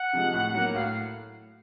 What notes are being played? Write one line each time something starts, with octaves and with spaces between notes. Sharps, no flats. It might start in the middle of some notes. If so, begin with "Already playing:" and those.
Already playing: F#5
C3 F3 G#3
A2
F#3 A#3
A2 F5